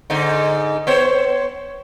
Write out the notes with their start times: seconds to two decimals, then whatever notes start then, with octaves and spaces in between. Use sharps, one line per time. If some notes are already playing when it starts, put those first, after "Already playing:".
0.10 G#2 D3 D#4
0.87 B3 C5 C#5